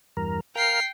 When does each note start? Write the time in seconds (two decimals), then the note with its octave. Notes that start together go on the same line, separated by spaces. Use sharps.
0.17 E2 G2 A#4
0.55 A#4 F5 G5 C7